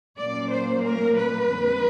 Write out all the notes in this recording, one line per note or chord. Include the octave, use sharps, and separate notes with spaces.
A#2 F#3 A#3 C#4 D5
C5
A#4
B4
F2 D3 G3 C4